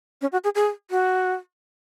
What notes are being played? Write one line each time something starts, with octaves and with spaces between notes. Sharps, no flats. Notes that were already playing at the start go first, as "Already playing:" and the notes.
C#4
F#4
G#4
G#4
F#4